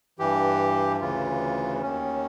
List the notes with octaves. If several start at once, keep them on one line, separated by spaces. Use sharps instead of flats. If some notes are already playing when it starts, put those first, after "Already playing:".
G2 E3 G4
D2 C#3 E3 F4
D#2 D#3 C#4